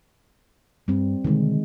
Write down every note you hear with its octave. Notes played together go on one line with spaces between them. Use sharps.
G2 G3 C4
B2 D3 D#3 G#3